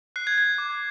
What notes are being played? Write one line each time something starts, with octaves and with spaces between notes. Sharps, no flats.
F#6 C7
G#6
F#6 G#6
D6